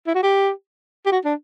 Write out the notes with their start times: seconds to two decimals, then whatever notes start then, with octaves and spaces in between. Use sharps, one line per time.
0.07 E4
0.15 F#4
0.23 G4
1.06 G4
1.12 F#4
1.25 D4